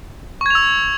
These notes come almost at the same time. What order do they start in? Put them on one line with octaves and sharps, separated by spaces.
C#6 G#6 F7 E6